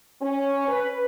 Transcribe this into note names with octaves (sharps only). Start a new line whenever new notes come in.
C#4
B4